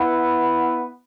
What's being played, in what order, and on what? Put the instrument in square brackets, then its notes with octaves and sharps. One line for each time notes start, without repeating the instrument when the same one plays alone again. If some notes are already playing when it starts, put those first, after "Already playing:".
Already playing: [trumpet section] B3 E4 B4 F#5